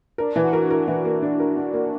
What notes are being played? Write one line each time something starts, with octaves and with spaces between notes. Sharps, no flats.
D4 A#4
E3
F#4
A#4
E4
A#4
E3 F#4
A#3
D4
A#4
D4
A#3